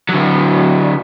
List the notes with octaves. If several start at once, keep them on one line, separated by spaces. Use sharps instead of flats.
D3 F#3